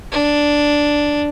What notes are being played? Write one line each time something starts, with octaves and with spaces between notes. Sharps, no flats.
D4